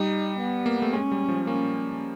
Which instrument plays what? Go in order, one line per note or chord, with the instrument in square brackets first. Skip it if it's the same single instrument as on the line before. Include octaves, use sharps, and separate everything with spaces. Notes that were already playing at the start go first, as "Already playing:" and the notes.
Already playing: [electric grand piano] G3 [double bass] D#4
[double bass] B3
[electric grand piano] A#3
A3
[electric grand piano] G#3 [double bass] C#4
[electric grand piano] G3
F3
[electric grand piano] A#3 [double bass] C#4